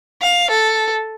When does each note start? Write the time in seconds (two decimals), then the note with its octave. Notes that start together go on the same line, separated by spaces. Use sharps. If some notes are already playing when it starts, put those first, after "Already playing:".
0.22 F5
0.51 A4